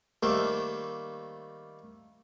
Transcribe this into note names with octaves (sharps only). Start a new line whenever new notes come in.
D#3 G3 A3 A#3 C5